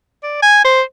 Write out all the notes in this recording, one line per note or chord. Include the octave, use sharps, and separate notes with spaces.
D5
G#5
C5